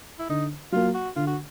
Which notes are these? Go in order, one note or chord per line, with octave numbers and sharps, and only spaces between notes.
E4
D3 D#4
F#3 A#3 F4
F#4
D3 F4
F#4